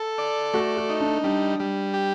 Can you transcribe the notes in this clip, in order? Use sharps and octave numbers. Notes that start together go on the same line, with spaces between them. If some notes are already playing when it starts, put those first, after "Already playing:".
Already playing: A4
D5
A3 F#4
F#4
D#4
D4
G3 D4
G3
G4